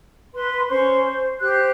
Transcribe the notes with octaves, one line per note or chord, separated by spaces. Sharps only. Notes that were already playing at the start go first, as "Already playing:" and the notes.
B4 C6
C#4 C5 C6 C#6
C5
G4 C5 F#6